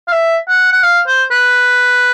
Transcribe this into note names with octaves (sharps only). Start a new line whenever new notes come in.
F5
E5
F#5
F#5
F5
C5
B4